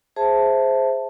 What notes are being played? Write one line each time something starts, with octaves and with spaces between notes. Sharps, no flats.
G#4 C5 E5 A5